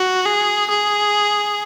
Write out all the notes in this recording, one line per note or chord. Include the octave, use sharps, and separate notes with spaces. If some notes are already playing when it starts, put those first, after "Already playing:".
Already playing: F#4
G#4
G#4